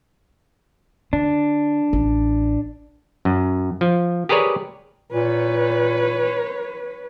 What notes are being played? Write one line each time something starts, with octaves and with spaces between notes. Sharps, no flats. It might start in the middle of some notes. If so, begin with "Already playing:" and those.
D3 D4
A1
F#2
F3
G4 G#4 A#4 B4 C#5 D5
A#2 B4 C#5